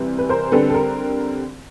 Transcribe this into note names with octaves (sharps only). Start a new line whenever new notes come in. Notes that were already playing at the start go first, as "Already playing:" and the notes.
Already playing: C3 E3 G3
B4
A#4 C5
D3 G3 C4 A4 B4
A4
A#4